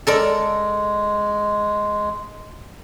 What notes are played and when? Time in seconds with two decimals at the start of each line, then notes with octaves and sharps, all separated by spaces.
0.07 G#3 A4 A#4 D5